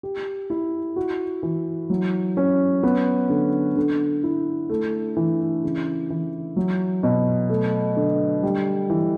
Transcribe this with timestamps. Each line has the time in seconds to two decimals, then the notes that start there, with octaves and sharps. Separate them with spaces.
0.03 G4
0.50 E4
0.96 F#4
1.43 E3
1.90 F#3
2.37 C#4
2.83 B3
3.30 D3
3.76 D3
4.24 E4
4.69 A3
5.17 E3
5.64 C#3
6.10 E3
6.56 F#3
7.03 B2
7.50 A3
7.96 D3
8.43 G3
8.90 E3